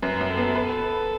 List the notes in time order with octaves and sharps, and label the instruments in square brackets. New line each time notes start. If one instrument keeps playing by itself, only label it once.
[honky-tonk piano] F#2 [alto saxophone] B4
[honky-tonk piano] F#2
[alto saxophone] A4
[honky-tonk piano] B3
[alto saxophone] A4 [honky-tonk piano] B4